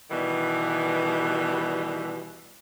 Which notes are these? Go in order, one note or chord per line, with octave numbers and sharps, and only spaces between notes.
B2 D#3 E3 G3